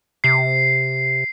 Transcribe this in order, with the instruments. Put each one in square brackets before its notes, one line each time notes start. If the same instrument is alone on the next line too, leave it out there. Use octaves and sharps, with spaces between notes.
[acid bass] C3 [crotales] C7